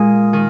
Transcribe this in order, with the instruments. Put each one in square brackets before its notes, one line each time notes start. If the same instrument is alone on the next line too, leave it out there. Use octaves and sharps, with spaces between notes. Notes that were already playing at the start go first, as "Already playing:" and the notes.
Already playing: [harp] A#2 G#3 G#4
D#3